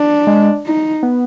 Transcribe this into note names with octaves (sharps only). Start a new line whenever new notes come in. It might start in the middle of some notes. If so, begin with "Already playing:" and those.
Already playing: D4
G#3
D#4
B3